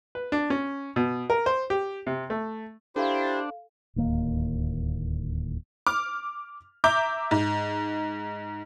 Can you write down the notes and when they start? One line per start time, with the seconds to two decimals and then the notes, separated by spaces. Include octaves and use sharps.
0.15 B4
0.32 D4
0.50 C#4
0.96 B2
1.30 A#4
1.46 C5
1.70 G4
2.07 C3
2.30 A3
2.96 D4 E4 G4 A4 C5 F5
3.96 D1 D#2 A#3
5.87 D6 F6
6.84 E5 A#5 D6 G6
7.31 G#2